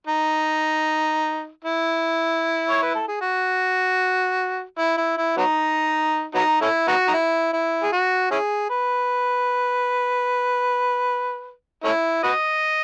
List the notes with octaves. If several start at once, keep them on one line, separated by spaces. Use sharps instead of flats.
D#4
E4
C#5
B4
A4
G#4
F#4
E4
E4
E4
F#3 B3 D#4
F#3 B3 D#4
A3 C#4 E4
B3 D#4 F#4
D#4
E4
E4
G#4
F#4
C#4 E4 G#4
B4
A3 C#4 E4
F#4 B4 D#5